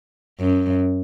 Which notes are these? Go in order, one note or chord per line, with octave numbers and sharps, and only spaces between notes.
F#2